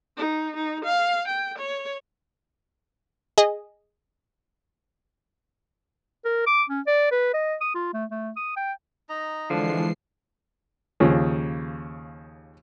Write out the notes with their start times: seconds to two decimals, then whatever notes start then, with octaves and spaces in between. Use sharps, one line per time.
0.17 D#4
0.56 D#4
0.85 F5
1.28 G5
1.59 C#5
3.38 G#4 D#5
6.25 A#4
6.47 D6
6.70 C#4
6.87 D5
7.11 B4
7.34 D#5
7.61 D#6
7.75 F4
7.94 A3
8.11 A3
8.36 D#6
8.57 G5
9.09 D#4 D#5 A#5
9.50 D3 E3 F3 G#3 D4 C7
11.00 D#2 C#3 F3